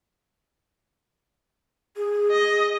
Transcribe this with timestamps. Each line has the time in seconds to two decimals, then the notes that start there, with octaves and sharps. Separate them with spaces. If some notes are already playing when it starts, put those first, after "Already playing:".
1.97 G#4
2.31 D#5